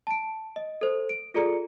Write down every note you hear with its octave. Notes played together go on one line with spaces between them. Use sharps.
A5 D7
D#5
A4 C5
D7
F4 G#4 A4 D5 A#5 C#7